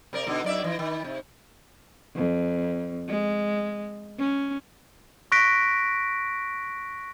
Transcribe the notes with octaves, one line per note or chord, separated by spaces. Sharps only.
C3 A#4 D5
B2 D3 D#4
F#2 D5 E5
E3
D#3
C3
F2
G#3
C#4
C#6 F#6 A#6 B6 D7